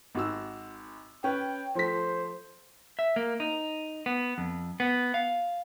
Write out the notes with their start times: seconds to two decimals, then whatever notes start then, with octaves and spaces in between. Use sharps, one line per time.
0.15 G#1 F#4 E6
1.24 C#4 B4 G5
1.75 F3 A3 C5 B6
2.99 E5
3.16 A#3
3.40 D#4
4.06 B3
4.38 F2
4.80 B3
5.14 F5